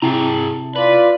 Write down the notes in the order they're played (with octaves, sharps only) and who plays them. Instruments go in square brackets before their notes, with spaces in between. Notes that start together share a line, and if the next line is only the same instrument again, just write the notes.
[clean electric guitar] C3 [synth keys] E4 A5 [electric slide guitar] G#4 G5 A#5
[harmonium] F4 D5 [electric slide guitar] B4